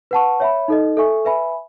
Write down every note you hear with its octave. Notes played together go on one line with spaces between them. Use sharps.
B4 F#5 A5 C#6
C#5 E5 B5
D#4 A4 D#5
A4 E5 G#5 C#6
B4 E5 G#5 B5